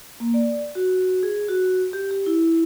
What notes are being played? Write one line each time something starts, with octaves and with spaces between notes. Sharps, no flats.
A#3
D5
F#4
G#4
F#4
G4
G4
E4